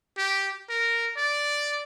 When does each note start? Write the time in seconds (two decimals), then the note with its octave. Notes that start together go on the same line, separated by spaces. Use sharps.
0.17 G4
0.70 A#4
1.17 D5